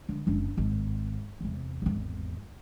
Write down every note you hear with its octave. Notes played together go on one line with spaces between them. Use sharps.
D3
F#1 D4
G#1
E2 C3
G#1 E2